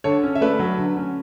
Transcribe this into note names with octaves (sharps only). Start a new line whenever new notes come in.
D3 A4 C#5
C#4
E5
A3 B4 D5
F#3
D3
C#4